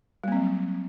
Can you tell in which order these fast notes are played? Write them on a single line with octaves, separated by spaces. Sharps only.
G3 A#3 C4 F#3